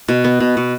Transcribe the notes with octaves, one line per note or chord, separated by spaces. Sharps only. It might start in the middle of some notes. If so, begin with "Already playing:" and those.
B2
B3
B2
B2